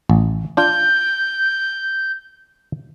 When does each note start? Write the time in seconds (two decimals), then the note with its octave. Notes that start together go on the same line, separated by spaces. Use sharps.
0.10 A1
0.57 D4 F4 G6